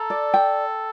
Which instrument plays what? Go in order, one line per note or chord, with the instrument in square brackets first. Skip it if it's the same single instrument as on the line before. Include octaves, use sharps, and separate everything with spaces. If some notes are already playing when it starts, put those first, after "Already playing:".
Already playing: [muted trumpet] A4 [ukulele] A#5
[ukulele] D5
G5